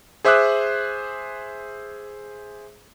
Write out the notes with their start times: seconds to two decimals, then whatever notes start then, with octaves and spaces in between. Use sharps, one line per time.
0.25 G#4 C5 E5 D6 D#6 F#6